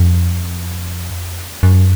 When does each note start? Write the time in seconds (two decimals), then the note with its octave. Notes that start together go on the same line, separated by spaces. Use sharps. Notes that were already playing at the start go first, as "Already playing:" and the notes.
Already playing: F2
1.63 F#2